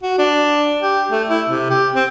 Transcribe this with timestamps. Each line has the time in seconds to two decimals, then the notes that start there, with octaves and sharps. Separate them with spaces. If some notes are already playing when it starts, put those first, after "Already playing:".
0.03 F#4
0.19 D4
0.82 G4
1.11 A3
1.29 E4
1.49 C3
1.70 G4
1.95 C4